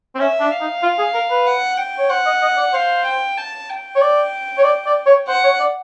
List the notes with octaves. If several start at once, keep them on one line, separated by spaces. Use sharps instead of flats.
C4
C#4 E5
D4
F5
D#4
F4
G#4
A#4
B4
F#5
G5
C#5
C5 F#5
D#5
D#5
D5
C5 F5
G5
A5
G5
C#5
D5
C#5
D5
D5
C#5
C5 F#5
C#5
D5